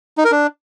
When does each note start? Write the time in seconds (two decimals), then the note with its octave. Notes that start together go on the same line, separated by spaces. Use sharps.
0.18 D#4
0.25 A#4
0.32 D4